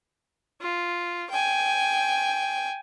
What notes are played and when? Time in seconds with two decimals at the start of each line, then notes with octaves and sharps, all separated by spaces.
0.61 F4
1.30 G5 G#5